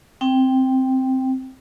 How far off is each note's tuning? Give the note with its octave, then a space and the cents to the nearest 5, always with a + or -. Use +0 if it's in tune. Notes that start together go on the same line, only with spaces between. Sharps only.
C4 +0 G5 +0